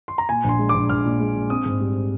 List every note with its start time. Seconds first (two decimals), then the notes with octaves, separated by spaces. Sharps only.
0.08 C6
0.18 A#5
0.29 A#2 G#5
0.44 A#1 C6
0.59 G#3
0.69 D6
0.74 A#1
0.89 A#1 F6
1.05 A#2
1.20 G#3
1.35 A#2
1.50 C4 D#6
1.66 G#2
1.81 G3